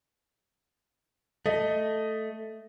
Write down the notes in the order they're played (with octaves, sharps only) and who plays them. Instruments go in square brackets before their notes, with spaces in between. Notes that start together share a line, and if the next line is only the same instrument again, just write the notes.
[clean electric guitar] A3 [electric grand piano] D#5